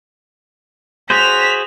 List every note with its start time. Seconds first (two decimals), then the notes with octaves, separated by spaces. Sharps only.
1.10 F#4 G#4 C5 B6 F7